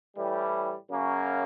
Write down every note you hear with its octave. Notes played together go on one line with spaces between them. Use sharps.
A2 E3 G3
F#2 C#3 F#3 A#3 C#4